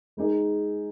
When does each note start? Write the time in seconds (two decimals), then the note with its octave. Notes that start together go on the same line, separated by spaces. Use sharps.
0.17 G#3 D#4 G#4